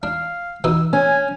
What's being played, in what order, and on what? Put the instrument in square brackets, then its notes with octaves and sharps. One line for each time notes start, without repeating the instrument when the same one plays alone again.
[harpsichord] D4 [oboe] F5
[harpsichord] B2 E3 D#4 [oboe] E6
[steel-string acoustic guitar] C#4 [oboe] G#5